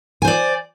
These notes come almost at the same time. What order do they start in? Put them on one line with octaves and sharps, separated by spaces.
G#5 C5 D5